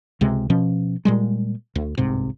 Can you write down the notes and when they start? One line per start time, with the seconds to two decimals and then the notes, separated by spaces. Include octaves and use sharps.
0.21 C#2 C3 G#3
0.50 B2 F3 C#4
1.05 A#2 G3 G#3
1.75 D2
1.98 G1 C2 G#2 C3